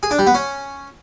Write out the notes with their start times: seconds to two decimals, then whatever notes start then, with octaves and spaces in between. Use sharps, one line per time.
0.03 G#4
0.11 D4
0.19 G3
0.27 B3
0.35 C#4